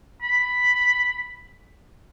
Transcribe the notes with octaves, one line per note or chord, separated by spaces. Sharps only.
B5